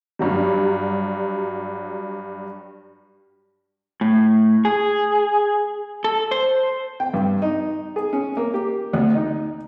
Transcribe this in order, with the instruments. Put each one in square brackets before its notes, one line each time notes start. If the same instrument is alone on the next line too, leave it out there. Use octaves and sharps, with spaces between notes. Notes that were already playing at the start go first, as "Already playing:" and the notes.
[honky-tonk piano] G2 F#3 G3
[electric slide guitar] A2
G#4
A4
C5
[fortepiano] G5
G2
D#4
G#4
C#4
A#3
G4
D2
D#4